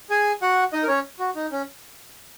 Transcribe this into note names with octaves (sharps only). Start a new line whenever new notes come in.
G#4 G#5
F#4 F#5
D#4 D#5
A#4
C#4 C#5
F#4
D#4
C#4